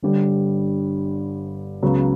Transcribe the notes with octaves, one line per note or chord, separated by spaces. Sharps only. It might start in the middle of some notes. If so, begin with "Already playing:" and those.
G1 G2 D3 G3
C#2 C#3 F#3 B3